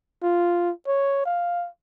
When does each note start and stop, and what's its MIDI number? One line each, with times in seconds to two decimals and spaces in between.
0.23 0.72 65
0.87 1.23 73
1.26 1.68 77